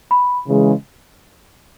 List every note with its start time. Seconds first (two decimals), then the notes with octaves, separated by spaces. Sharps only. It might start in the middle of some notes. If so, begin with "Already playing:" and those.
0.11 B5
0.46 C#3 E3 G#3